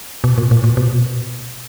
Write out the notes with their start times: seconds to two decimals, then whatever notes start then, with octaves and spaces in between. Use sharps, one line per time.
0.24 B2
0.38 A#2
0.51 A#2
0.64 A#2
0.77 B2